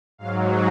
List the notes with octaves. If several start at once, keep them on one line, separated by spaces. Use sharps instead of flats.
G#2 F#3 F5